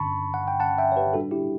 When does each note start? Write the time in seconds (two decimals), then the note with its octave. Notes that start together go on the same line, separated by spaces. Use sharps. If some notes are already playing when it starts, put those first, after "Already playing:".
Already playing: G1 G2 D3 A5 B5 C#6
0.34 F#5
0.48 G5
0.60 F#5 A5
0.78 E5 G5
0.92 C#5
0.96 G4 B4
1.13 A2 G3 D4 F#4 A4
1.31 E4 G4